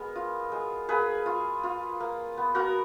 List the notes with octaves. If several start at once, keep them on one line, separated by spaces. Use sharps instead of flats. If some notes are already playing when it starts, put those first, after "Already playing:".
Already playing: G#3 B3 A#4
F4
G#3
A#3 G#4 B4
F4
F4
A#3
B3
F#4 A#4